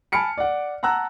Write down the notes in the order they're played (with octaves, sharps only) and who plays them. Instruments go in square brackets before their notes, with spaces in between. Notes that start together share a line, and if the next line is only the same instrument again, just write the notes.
[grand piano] G#5 A5 B5 F6 C#7 D7
D5 F#5
F#5 A5 A#5 E6 F#6